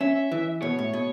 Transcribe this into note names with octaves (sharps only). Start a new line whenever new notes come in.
C#4 E5
E3
B2 C#5
A2
B2